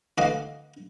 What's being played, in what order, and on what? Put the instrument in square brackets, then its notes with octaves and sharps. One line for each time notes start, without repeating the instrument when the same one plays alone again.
[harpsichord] D2 E3 F#4 D#5 F5 D6